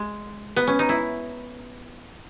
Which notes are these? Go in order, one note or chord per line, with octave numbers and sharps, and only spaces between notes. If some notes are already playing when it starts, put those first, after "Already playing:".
Already playing: G#3
B3
C#4
D#4
E4